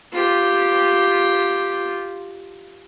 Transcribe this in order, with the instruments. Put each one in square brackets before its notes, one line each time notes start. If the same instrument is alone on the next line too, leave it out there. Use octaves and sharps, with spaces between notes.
[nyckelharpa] F4 G4